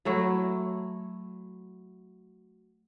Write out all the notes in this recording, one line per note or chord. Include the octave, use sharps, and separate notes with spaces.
F#3 A3 E4